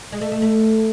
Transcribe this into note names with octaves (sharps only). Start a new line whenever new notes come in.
G#3
A3
A3
A3